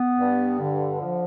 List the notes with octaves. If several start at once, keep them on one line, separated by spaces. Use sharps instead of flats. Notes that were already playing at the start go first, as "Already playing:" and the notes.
Already playing: B3
G2
D3
F3